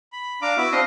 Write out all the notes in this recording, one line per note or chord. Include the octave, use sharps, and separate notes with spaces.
B5
D4 F5 A#5 D6
B3 E4 F#4 E5
C4 D4 D#5 F5